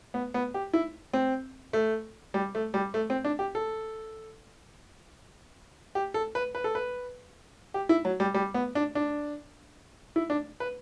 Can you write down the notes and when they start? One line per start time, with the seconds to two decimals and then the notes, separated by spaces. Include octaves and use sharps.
0.14 B3
0.34 B3
0.54 G4
0.73 E4
1.13 C4
1.73 A3
2.34 G3
2.55 A3
2.74 G3
2.94 A3
3.10 C4
3.25 D4
3.39 G4
3.55 A4
5.95 G4
6.14 A4
6.35 B4
6.55 B4
6.64 A4
6.75 B4
7.74 G4
7.89 E4
8.05 F#3
8.20 G3
8.34 G3
8.54 B3
8.75 D4
8.95 D4
10.16 E4
10.30 D4
10.60 B4